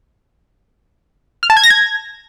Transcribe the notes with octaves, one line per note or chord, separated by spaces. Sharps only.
F6
A5
G#6
A#6
G#6